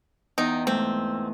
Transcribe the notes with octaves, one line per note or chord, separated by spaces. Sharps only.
E2 D#4 G5 A#5
G#2 A3 C4